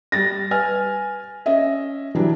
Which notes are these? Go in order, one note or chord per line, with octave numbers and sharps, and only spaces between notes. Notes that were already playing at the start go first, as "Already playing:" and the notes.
G3 A6 A#6
B4 G#5 F6
C#4 D#5 E5
E3 F#3 G3 D4